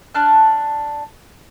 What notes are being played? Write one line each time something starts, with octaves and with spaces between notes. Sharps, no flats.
D4 A5 F6 F#6